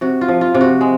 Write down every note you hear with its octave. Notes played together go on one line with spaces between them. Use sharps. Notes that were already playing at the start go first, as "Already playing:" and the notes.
C3 F#4
F4
F3
F4
C3
F#4
G#3